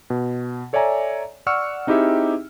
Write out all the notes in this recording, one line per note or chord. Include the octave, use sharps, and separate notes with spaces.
B2
A4 C#5 D5 E5 G#5 A#5
D5 F#5 C#6 E6 F6 C#7
C4 D#4 E4 G4 G#4 E5